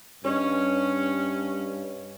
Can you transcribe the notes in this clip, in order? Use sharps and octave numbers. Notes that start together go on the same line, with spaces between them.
G2 C#4 C#5 D#5